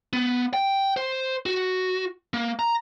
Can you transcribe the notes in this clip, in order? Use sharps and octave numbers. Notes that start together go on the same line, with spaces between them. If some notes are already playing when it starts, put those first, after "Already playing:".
B3
G5
C5
F#4
A#3
A#5